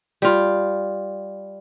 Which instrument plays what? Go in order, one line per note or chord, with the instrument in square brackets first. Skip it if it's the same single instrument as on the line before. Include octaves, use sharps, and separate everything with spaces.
[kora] G3 F4